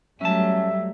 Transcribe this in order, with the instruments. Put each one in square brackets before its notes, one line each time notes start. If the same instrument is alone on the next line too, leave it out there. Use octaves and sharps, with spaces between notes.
[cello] F#3 [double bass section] G3 A3 [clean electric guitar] C#4 A5 [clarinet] E5